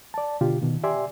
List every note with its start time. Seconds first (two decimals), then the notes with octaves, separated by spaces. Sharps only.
0.14 D5 A5
0.41 B2 D3 F4 G4
0.62 B2 D#3
0.84 G4 D5 E5 G#5 C6